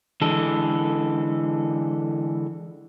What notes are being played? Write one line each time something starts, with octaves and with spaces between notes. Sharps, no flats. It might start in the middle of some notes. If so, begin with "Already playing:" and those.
D3 E3 G#3 A4